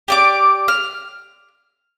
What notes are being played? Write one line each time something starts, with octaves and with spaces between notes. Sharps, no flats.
G4 D5 D6
F6